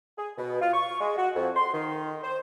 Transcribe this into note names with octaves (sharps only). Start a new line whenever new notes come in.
G#4
B2
F4
C#6
G#3
F#4
F2
C6
D#3
C5